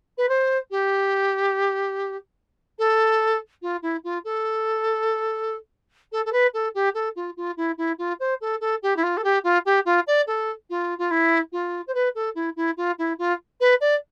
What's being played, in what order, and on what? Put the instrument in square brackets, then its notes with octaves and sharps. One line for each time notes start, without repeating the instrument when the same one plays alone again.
[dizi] B4
C5
G4
A4
F4
E4
F4
A4
A4
A4
B4
A4
G4
A4
F4
F4
E4
E4
F4
C5
A4
A4
G4
E4
F4
A4
G4
F4
G4
F4
D5
A4
F4
F4
E4
F4
C5
B4
A4
E4
E4
F4
E4
F4
B4
D5